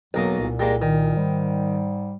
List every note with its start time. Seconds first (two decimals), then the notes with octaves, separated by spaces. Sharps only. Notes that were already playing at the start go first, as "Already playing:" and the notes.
0.14 B1 E2 F#3 A#3 D#4
0.39 C2 A#2
0.60 G3 G#3 A#3
0.82 D#3
1.16 G#2 G3